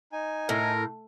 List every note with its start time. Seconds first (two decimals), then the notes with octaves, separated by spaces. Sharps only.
0.12 D#4 G#5
0.49 A2 A#4